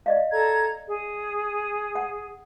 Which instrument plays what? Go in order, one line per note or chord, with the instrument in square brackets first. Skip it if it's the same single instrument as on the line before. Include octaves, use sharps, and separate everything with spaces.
[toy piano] D5 D#5 F5
[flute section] A4 A#5 G#6
G#4
[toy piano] F#5